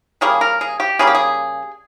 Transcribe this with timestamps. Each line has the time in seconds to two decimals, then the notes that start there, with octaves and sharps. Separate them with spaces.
0.21 C#3 G3 A#3 G#4
0.41 A#4
0.61 G#4
0.80 G4
0.99 C#3 G3 A#3 G#4
1.07 G4
1.15 G#4